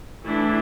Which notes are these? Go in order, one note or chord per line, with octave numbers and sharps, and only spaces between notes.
E3 A3 D4 E4